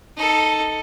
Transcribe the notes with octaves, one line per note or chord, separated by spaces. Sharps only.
D#4 A4